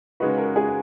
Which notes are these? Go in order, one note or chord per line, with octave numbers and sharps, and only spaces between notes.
C#3 G#3 D#4 F#4 B4
A#4
G#4